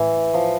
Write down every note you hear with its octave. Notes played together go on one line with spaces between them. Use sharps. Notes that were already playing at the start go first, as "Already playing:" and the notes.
Already playing: A2 E3
F3